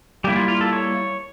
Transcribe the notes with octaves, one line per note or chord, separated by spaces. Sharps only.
G3 A#3 E4 G4
F4
F4
A4
C#5